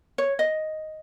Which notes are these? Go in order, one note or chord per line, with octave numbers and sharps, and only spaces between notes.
C#5
D#5